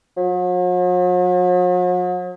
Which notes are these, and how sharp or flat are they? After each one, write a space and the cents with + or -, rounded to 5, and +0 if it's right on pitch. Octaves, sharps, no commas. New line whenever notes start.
F#3 -45